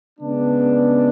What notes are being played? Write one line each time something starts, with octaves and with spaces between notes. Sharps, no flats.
C#3 G#3 B3 D4